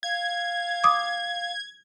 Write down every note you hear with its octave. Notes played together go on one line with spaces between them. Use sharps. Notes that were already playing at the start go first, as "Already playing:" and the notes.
F5 G#6
D6 D#6